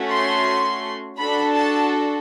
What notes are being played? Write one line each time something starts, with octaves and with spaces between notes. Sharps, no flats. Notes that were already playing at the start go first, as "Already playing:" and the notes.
Already playing: A3 C#4 F#4
C6
D4 F#4 A4 B5
A5